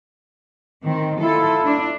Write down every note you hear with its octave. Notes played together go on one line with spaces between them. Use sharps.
D#3 C4
E4 F4 A4
D4